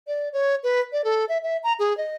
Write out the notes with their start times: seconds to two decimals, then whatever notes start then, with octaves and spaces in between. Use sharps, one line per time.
0.07 D5
0.33 C#5
0.63 B4
0.92 D5
1.04 A4
1.29 E5
1.44 E5
1.64 A#5
1.79 G#4
1.97 D#5